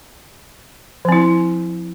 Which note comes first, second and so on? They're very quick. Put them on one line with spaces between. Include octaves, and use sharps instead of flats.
F3 C4 E4